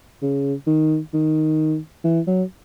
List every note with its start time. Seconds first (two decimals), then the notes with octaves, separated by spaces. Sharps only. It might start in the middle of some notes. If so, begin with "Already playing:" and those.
0.22 C#3
0.67 D#3
1.14 D#3
2.04 E3
2.27 F#3